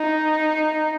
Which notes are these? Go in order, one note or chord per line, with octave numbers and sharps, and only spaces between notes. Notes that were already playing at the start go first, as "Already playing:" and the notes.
Already playing: D#4